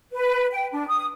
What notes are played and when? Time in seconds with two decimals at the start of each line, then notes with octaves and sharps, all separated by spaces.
0.12 B4
0.52 G5
0.72 D4
0.88 D#6